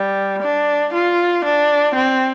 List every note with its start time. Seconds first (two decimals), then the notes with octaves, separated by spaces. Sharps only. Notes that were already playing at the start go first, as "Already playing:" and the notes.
Already playing: G3
0.42 D4
0.94 F4
1.45 D4
1.95 C4